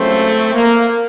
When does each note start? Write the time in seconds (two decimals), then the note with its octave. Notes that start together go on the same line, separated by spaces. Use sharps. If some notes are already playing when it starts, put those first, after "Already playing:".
Already playing: C#2 C#3 F#3 A3 C4
0.54 A#3